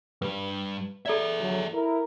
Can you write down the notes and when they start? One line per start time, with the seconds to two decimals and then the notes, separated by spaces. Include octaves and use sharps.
0.22 G2 G3 B4
1.06 G#4 A4 D5 E5
1.39 D3 F#3
1.73 E4 A#4